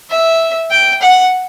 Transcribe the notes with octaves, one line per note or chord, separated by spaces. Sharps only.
E5
G5
F#5